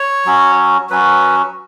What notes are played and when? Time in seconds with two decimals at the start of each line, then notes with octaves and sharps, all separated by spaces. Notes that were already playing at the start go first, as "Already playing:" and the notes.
Already playing: C#5
0.25 F#3 C#4 F#4
0.90 F#3 C#4 F#4 B4